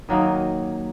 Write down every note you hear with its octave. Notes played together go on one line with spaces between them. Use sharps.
D#3 F#3 A#3 D#4